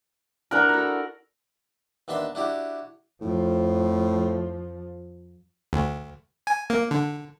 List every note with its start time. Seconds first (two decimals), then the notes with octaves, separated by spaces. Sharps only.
0.51 D4 E4 A#4 F#5 A#5
0.69 F#4 A4
2.08 D#2 B3 D4 E5 C6
2.35 D4 E4 F#4 G4
3.21 F2 A2 F3
5.73 D2
6.47 G#5
6.70 A#3
6.91 D3